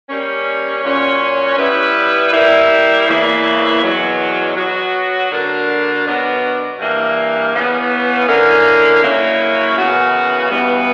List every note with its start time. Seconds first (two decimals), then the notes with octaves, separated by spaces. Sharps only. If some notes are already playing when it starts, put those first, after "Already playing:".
0.09 G3 A#3 C#4
0.84 A#2 F#3 C#4
1.58 G3 B3 E4 B4
2.32 G3 A#3 E4
3.07 E2 C#3 E3 A#3 E4
3.81 E2 B2 F#3
4.56 F#3 B3 F#4
5.30 D3 A#3 D4 F#4 A#4
6.05 B2 F#3 B3 D4 A#4
6.78 G2 E3 A#3
7.54 C#3 E3 B3
8.27 D3 A#3 C#4 E4 A#4
9.02 C#3 F#3 A#3 C#4 E4
9.77 F#2 C#3 E3 B3 F#4
10.51 G2 E3 G3 B3